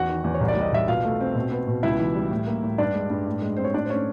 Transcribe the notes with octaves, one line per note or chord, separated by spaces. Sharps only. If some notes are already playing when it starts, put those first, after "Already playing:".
Already playing: E2 F#4 F#5
D#3
E2
C#5
C2
D5
G3
D#5
C2 E5
B2 F4 F5
A3
C4
B2
B3
B2
C#2 E4 E5
E3
G3
A2
A#3
A2
G2 D4 D5
G#3
G2
A2
G#3
C4 C5
C#5
A2 D4 D5
C5
A3 C#4 C#5